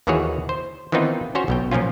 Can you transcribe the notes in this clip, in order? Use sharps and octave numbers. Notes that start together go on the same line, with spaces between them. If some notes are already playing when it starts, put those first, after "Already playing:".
D#2 D#3 E3 F#4 G#4 C#5
C5
D#3 E3 B3 C4 D#4 F4
C#4 F#4 C5 C#5
B1 B2 G5
A#2 F3 F#3 C#4 F4